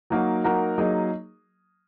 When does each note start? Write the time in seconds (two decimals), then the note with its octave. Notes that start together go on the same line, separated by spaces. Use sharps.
0.10 F#3 A#3 D#4 F#4 A#4
0.44 F#3 A#3 D#4 F#4 A#4
0.78 F#3 A#3 D#4 G#4 D#5